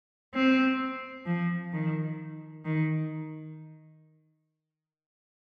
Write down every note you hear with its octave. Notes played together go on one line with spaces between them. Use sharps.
C4
F3
D#3
D#3